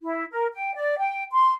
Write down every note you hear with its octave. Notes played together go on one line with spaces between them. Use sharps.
E4
A#4
G5
D5
G5
C6